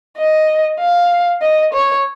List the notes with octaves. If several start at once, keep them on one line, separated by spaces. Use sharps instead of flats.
D#5
F5
D#5
C#5